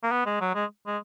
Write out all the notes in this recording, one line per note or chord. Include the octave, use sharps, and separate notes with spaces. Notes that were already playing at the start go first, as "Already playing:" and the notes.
A#3
B3
G#3
F#3
G#3
G#3